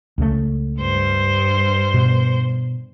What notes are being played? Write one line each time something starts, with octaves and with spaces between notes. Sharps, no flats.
C#2 C#3 A3
G2 C5
B2